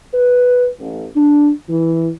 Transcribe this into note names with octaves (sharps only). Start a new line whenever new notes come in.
B4
A1
D4
E3